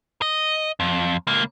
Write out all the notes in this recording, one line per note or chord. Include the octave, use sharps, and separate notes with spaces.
D#5
F2
C#2 A#3